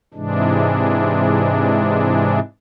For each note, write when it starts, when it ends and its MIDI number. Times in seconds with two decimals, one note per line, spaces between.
0.14 2.40 44
0.14 2.40 48
0.14 2.40 52
0.14 2.40 56
0.14 2.40 62